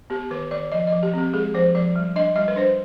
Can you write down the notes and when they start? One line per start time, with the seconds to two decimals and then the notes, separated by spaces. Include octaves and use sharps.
0.10 B3 G4
0.31 D#3 B4
0.51 D#3 D5
0.72 F3 D#5
0.87 D#5
0.93 F3
1.03 G4
1.13 C4 G4
1.33 G#3 G#4
1.54 F3 C5
1.75 F3 D5
1.96 G3
2.16 D4 D#5
2.36 G3 D#5
2.48 B4
2.56 D4 C5